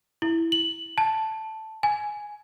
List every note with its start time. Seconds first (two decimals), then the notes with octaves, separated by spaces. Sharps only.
0.22 E4
0.52 F#7
0.98 A5
1.83 G#5